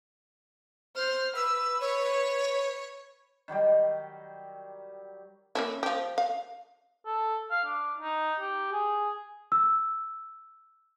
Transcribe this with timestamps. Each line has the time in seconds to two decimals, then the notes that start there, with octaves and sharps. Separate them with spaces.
0.96 C5 F6
1.36 B4 E6
1.81 C#5
3.48 D#3 F#3 G3 G4
5.55 A#3 C#4 E4
5.83 F3 G4
6.18 F5
7.06 A4
7.51 F5
7.65 D4
7.98 D#4
8.40 G4
8.72 G#4
9.52 E6